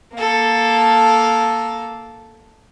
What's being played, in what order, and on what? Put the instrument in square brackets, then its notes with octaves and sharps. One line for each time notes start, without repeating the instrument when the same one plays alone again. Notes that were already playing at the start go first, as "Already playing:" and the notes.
[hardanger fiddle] A#3 A4